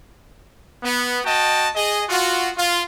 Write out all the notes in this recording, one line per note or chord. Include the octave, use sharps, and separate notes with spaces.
B3
F#4 D#5 G5 A5
G#4 D#5
F4 F#4
F4